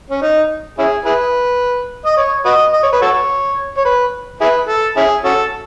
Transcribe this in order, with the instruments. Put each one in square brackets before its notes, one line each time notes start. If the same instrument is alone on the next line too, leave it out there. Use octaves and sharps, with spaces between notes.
[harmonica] C#4
D#4
C#4 E4 G#4
E4 G#4 B4
D#5
C#5
F#4 B4 D#5
D#5
C#5
B4
F#4 A4 C#5
C#5
B4
E4 G#4 B4
A4
C#4 E4 G#4
C#4 F#4 A4